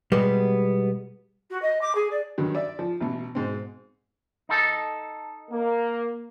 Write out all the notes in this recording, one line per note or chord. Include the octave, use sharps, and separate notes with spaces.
B2 G3 G#3 B3
F#4
D#5
D6
G#4
D5
G2 D#3 F#3
D5 E5
F3
A1 B2
G#2 B2 C4
D#4 A4
A#3